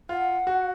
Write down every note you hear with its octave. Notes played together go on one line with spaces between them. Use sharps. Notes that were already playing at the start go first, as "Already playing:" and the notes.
F4 F#5
F#4